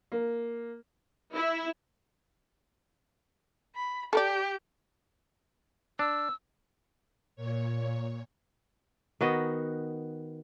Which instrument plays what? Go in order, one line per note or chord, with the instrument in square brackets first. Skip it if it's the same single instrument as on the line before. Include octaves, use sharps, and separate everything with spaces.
[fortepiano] A#3
[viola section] E4
[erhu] B5
[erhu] G4 [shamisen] A4 A#4 D5
[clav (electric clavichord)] D4 [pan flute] E6
[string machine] A#2 C#5
[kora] D#3 B3 F#4 D#5